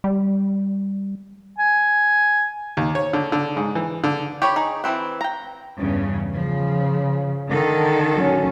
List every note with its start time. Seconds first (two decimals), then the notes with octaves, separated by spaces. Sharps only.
0.04 G3
1.58 G#5
2.77 D#2
2.95 C#5
3.13 D3
3.32 D3
3.57 G#2
3.75 E3
4.04 D3
4.42 G4 C#5 B5
4.56 D#4 G#4
4.84 E3 F#3 C4 B4
5.21 G5 A#5
5.79 E2 G2 C#3
6.33 C#3 F3
7.49 D3 D#3 A4
8.14 F#3 C#4